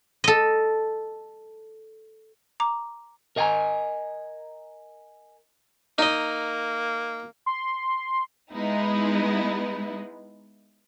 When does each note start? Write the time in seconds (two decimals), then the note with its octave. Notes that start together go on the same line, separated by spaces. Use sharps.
0.24 A4 D#5
2.60 A#5 D6
3.36 A#4 D#5 F5 G5 G#5 A#5
5.98 A#3 D#4 D#5
7.46 C6
8.53 G#3 B3 D#4 E4